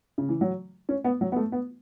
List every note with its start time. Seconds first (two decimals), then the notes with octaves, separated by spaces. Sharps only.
0.18 C#3
0.29 E3
0.41 F#3
0.89 C#4
1.04 B3
1.21 F#3
1.32 B3
1.36 A3
1.52 B3